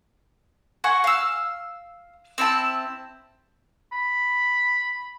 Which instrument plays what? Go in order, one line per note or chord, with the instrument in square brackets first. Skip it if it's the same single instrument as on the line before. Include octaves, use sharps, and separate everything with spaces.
[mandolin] F#4 F#5 G#5 C#6
F5 E6
C4 E4 A5
[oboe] B5